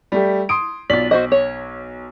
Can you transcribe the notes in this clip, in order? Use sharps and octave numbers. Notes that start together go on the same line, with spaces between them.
G3 A3 G4
C6 D#6 D7
B1 F4 D5 B6 F#7
F#4 C5 D#5
C#5